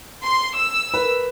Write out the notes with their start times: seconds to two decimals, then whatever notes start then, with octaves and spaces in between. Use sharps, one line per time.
0.24 C6
0.58 E6
0.94 A#4 B4